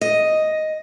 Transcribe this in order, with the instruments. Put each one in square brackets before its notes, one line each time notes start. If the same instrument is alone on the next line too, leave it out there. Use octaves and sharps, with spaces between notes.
[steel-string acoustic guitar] D#5